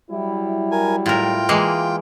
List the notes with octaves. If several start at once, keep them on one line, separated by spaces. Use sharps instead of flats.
F#3 G3 E4
A#4 G#5
A2 F4 A#4 G5
E3 G#3 A#3